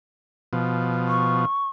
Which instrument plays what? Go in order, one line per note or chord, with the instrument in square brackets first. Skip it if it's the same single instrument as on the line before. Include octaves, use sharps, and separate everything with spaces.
[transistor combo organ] B2 F3
[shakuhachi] C#6